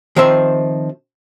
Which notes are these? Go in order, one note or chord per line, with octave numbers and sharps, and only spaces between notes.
D#3 F3 C4 E5